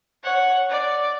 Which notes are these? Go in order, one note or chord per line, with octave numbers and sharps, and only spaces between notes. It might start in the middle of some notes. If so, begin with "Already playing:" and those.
C#5 F#5
D5